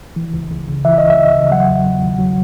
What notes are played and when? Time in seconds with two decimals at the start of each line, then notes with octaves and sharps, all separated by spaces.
0.16 E3
0.33 C#2
0.51 C#2
0.68 C#3
0.85 E3 E5
0.98 C#2 D#5
1.10 E5
1.18 C#2
1.35 C#3
1.51 F#3 F#5
1.68 E2
1.86 E2
2.02 D#3
2.19 F#3